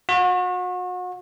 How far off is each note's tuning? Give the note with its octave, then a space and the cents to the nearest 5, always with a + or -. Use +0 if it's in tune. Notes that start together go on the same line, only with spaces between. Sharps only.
F#4 -35